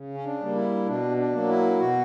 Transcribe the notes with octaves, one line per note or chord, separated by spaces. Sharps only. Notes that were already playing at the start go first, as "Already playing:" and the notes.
Already playing: C#3
C#4
D4
G3 A#3
E4
B2 D4
D4
F#3 A#3
E4
B2 F#4